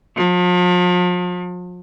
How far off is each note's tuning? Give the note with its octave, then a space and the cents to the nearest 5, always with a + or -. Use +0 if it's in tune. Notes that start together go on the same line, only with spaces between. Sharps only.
F3 +40